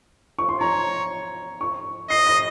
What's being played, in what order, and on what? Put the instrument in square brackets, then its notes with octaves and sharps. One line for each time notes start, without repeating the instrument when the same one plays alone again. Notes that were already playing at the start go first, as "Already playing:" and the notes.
[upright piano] C#6
C6
[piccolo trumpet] C#5 [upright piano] A#5
[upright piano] C#6
[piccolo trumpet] D#5 [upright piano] C7
[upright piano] A#6